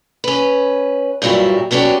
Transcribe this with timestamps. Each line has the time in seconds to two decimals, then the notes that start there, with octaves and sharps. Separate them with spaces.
0.24 C#4 B4
1.22 G2 A#2 F#3 G3 E4
1.71 F#3 B3 C#4 D4 G4